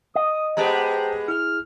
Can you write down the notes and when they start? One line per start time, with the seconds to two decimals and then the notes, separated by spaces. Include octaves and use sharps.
0.16 D#5 D#6
0.57 G#3 B3 G4 C5 G5 A5 A#5
1.28 E4 G#4 F6